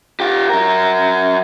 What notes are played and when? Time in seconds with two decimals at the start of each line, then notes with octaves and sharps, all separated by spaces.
0.20 F4 G4
0.50 F#3 A#4